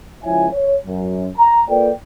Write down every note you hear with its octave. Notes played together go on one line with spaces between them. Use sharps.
C#2 F3 E4 C#5 E5 G#5
C#5
F#2
A#5
A#3 F4 A4 B4 D5 G5